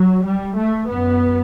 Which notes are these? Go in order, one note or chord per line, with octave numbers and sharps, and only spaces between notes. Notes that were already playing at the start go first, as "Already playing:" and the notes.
Already playing: F#3
G3
A3
F#2 B3